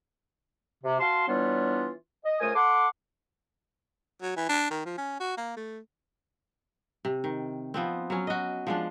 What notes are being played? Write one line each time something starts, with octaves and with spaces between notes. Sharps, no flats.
C3
F#4 F5 A5 C6
E3 G3 B3 D4 F4 C#5
D#5
C#2 A3 A#4 C5 G#5 D#6
A4 F#5 C6 D6
F#3
E3
D4
D#3
F3
C#4
F#4
A#3
A3
C3
D#3
F3 B3 C4
F#3 C#4
F#4 D#5
F3 G#3 D4